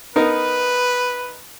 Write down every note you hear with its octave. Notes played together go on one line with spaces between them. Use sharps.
B3 D#4 A#4 B4